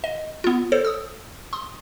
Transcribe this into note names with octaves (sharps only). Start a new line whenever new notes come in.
D#5
B3 F4
A4 C5 C#5
D#6 E6
C6 D#6